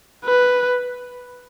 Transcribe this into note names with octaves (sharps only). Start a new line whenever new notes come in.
B4